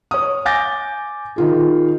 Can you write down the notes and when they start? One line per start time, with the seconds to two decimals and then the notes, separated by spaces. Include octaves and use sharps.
0.11 C#5 D#6
0.45 G#5 D6 G6 A6 A#6
1.36 D#3 F4 G#4